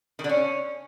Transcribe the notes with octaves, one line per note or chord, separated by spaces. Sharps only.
D#3
D3
C#4